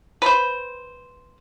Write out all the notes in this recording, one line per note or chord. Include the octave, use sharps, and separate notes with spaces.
B4 C5